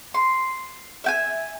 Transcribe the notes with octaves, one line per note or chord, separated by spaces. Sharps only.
C6
E5 G5 G#5